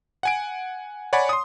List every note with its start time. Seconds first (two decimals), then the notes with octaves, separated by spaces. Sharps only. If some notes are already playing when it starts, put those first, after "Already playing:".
0.23 F#5 G#5 D7
1.13 C#5 D5 F#5 G#5 B5
1.29 C6 D#6